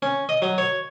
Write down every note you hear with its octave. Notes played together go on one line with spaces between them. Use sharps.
C#4
D#5
F#3
C#5